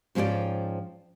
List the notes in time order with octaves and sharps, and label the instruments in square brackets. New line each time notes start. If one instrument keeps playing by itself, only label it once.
[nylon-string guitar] G#2 F3 C#4 G#4 D5 G5